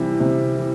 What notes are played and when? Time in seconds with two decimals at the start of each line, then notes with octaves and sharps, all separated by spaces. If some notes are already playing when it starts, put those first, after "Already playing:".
Already playing: C3 E3 G3
0.20 C3
0.57 E3